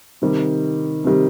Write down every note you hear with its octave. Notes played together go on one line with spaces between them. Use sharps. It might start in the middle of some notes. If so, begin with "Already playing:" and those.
C3 D#3 G3
C3 D#3 G3